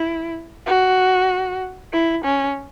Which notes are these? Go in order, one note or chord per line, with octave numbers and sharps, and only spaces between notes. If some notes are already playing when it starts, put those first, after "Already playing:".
Already playing: E4
F#4
E4
C#4